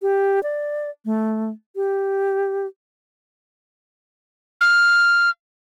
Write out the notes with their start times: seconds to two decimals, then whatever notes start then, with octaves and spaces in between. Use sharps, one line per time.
0.02 G4
0.43 D5
1.05 A3
1.76 G4
4.61 F6